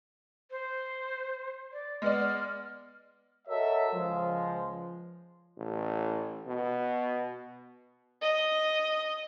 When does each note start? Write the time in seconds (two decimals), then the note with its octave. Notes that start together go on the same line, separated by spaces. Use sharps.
0.51 C5
1.73 D5
2.02 G#3 B3 D5 F6
3.48 F#4 A4 A#4 C#5 D#5 E5
3.93 C#2 F3 G#3
5.57 A1
6.47 B2
8.22 D#5